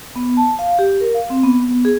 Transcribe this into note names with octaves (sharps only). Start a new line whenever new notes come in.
B3
A5
F5
G4
A#4
F5
C4
B3
B3
G#4